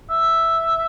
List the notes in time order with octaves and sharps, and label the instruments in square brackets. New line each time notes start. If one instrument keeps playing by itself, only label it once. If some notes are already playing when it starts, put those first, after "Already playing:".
[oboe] E5